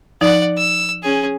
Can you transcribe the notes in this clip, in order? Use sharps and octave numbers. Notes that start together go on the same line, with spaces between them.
F3 D#4 D5 F#5
E6
C#4 G#4